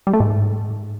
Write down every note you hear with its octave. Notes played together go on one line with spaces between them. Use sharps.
G3
A3
G#2